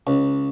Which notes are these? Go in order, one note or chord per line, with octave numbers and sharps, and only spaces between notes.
C#2